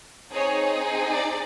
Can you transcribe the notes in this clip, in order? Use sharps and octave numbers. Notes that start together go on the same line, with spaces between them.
C4 D#4 G#4 C#5
D5